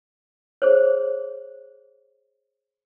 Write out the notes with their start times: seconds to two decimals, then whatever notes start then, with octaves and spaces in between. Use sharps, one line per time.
0.62 G#4 C5 C#5